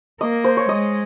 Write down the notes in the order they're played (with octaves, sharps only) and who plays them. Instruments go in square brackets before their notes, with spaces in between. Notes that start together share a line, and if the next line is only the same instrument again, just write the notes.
[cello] A#3 [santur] D#5
[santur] C5
C#5
[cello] G#3 [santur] D#5